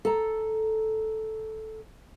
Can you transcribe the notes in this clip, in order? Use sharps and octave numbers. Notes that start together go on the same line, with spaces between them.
A4 A#5